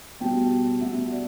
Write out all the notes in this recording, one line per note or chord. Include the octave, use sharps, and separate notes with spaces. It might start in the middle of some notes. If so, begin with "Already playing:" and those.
B2 G3 B3 G5 A5
B2 G3 B3 E5 F#5
D5 E5